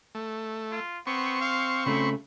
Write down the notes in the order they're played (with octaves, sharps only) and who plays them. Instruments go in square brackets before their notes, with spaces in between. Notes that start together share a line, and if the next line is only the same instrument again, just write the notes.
[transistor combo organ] A3
[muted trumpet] F4
[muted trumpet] B3 [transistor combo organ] C4 C#6
[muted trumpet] F5
[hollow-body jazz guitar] C#3 A3 [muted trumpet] B5